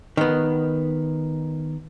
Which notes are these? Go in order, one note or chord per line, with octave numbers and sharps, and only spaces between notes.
D#3 B3